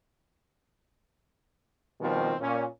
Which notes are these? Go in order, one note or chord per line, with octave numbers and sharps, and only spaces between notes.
D#2 B2 D#3 F3 G3 C4
A#2 C#4